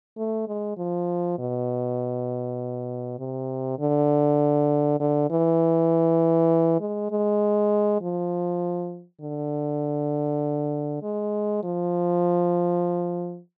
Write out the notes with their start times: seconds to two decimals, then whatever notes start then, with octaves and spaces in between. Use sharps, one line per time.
0.17 A3
0.48 G#3
0.77 F3
1.39 B2
3.19 C3
3.79 D3
5.00 D3
5.30 E3
6.81 G#3
7.11 G#3
8.01 F3
9.21 D3
11.03 G#3
11.63 F3